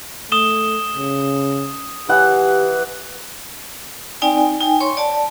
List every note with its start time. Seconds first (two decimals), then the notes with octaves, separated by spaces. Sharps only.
0.32 A3 D#6 E7 G7
0.97 C#3
2.09 E3 G4 F#5
4.22 C4 D#4 D5 G5 G#5
4.61 D#4 G5 G#5
4.81 C#5 C6 C#6
4.97 D5 A5